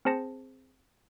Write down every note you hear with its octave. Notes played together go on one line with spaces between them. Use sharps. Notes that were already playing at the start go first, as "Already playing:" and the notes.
C4 G#4 C5 A5 A#6 C#7